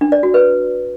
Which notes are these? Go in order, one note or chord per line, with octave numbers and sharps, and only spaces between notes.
D4
D5
F#4
B4